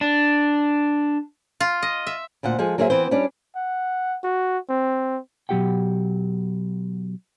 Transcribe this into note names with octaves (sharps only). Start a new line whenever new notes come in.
D4
F4
D#5
E5
D2 A#2 C5 F#5
F3 G#3 G#4 A4
F#3 A#3 G#4 C5 D#5 E5
E3 B3 C4 C5
G3 C#4 D4
F#5
F#4
C4
B2 F#3 C4 G4 F#5 G5